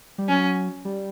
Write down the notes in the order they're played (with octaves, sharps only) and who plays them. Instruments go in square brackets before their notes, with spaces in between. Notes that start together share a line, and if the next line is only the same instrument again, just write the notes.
[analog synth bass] G3
[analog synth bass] F#3 [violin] C#4
[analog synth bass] G3